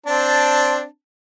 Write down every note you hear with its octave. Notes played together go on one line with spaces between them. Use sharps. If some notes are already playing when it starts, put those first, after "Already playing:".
C4 D4 A5